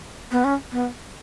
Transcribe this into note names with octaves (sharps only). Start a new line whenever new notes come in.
B3
C#4
B3